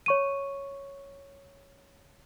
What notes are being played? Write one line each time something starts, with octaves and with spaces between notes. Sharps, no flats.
C#5 C#6 D#7